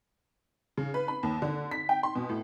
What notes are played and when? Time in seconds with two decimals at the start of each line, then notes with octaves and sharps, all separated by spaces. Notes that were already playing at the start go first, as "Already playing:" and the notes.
0.77 C#3
0.94 B4
1.08 B5
1.23 D#2
1.42 D3
1.71 B6
1.89 G5
2.03 C6
2.15 B2
2.29 A2